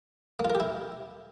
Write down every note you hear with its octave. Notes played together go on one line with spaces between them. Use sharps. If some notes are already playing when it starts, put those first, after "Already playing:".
A#3
F4
A#4
G4
E4